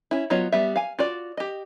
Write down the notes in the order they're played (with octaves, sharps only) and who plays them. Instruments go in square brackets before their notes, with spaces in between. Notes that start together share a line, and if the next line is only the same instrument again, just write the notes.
[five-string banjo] C#4 E4
F#3 B3 F4 C#5 D#5
G3 B3 E5
F5 G#5
F4 F#4 D5
G4 D#5